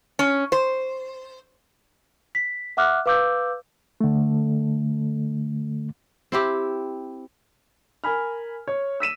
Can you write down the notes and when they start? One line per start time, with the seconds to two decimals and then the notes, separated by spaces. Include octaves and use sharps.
0.19 C#4
0.52 C5
2.35 B6
2.77 E5 F#5 D6 F6 F#6
3.06 B4 F5 D6 E6 G6
4.01 D3 A3
6.32 C4 E4 G4
8.04 A#4 G#5 B5 F6
8.68 C#5
9.00 E6 B6 D#7 E7